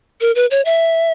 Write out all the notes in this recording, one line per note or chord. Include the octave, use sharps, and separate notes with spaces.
A#4
B4
C#5
E5